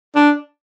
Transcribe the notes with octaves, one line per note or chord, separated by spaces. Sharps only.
D4